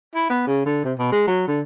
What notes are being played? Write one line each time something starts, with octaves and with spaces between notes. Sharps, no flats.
E4
B3
C#3
D3
C3
B2
G#3
F#3
D3